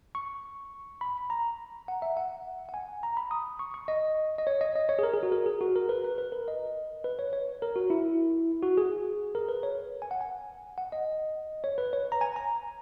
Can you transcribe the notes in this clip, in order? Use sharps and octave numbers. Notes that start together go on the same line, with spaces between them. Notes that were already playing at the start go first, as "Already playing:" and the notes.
C#6
B5
A#5
F#5
E5
F#5
F#5
G#5
A#5
B5
D#6
C#6
C#6
D#5
D#5
C#5
D#5
D#5
C#5
G#4
A#4
G#4
F#4
A#4
G#4
F#4
A#4
B4
B4
B4
A#4
D#5
B4
C#5
C#5
A#4
F#4
E4
F#4
G#4
A#4
B4
C#5
G#5
F#5
G#5
F#5
D#5
C#5
B4
C#5
A#5
G#5
A#5